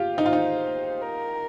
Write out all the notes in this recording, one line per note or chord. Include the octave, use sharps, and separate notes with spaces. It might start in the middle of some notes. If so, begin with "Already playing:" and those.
Already playing: F4 G4
D#4 C5
F4
D#4
A#4